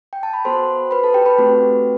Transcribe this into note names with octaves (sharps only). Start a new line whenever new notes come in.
G5
A5
B5
B3 F#4 A4 C5 C6
B4 B5
A4 A5
G4 G5
B4 B5
A3 C4 F#4 A4